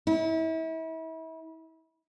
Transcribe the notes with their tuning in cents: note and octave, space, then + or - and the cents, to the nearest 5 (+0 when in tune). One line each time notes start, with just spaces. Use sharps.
E4 -35